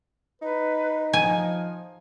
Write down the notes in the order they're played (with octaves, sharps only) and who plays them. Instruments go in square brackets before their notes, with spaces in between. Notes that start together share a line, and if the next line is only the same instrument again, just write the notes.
[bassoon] D#4 [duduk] B4
[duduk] F3 [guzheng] G#5